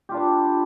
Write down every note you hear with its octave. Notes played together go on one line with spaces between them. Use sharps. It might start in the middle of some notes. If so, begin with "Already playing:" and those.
D4 F4 G4 B4